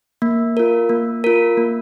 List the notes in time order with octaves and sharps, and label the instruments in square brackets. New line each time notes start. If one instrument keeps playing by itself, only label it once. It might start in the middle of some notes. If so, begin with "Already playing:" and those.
[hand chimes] A#3
F4 A#4
A#3
F4 A#4
A#3